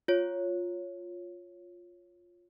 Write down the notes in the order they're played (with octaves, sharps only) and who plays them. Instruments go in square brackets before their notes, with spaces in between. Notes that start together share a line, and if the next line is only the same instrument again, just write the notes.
[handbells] F4 C#5